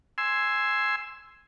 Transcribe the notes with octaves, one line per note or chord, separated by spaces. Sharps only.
G#5 C6 E6